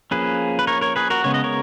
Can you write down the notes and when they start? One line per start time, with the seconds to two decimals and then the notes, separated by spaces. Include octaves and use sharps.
0.11 F3 A#3 C#4 G#4 B4
0.59 B4
0.67 A#4 C#5
0.81 A#4 C#5
0.96 G#4 B4
1.10 F#4 A#4
1.24 C#3 G#3 B3 C#5
1.34 D#5
1.44 A#4 C#5